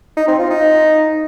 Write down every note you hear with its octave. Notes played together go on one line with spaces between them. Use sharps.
D#4
C4
F4
D#4